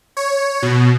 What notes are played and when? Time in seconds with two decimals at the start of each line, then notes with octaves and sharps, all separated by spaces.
0.17 C#5
0.62 B2